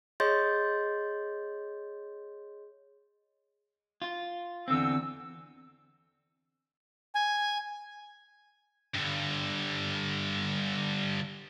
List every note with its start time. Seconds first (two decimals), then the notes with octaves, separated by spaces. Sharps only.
0.20 G#4 C#5 D#5 C6 G6 A6
4.02 F4
4.68 E2 D3 C4 E6
7.15 G#5
8.95 G2 D3